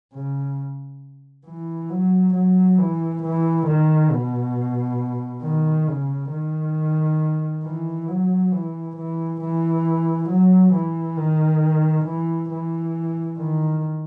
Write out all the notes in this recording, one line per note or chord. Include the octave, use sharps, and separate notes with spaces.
C#3
E3
F#3
F#3
E3
E3
D#3
B2
D#3
C#3
D#3
E3
F#3
E3
E3
E3
F#3
E3
D#3
E3
E3
D#3